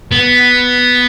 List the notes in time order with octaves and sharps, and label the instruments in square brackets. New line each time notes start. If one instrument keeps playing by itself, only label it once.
[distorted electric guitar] B3